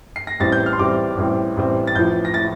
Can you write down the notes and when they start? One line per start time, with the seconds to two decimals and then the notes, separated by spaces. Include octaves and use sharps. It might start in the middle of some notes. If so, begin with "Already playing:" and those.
0.16 C7
0.27 A#6
0.40 A1 A2 G3 C4 A6
0.52 G6
0.66 F6
0.73 C6
0.79 A1 A2 G3 C4 D6
1.17 A1 A2 G3 C4
1.56 A1 A2 G3 C4
1.87 A6
1.95 A1 A2 F3 G6
2.25 A#6
2.34 A2 F3 A6